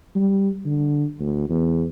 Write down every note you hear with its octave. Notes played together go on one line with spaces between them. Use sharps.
G3
D3
D2
E2